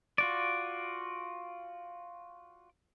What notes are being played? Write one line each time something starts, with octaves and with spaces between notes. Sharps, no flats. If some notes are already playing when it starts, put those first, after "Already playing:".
F4 F#4 D5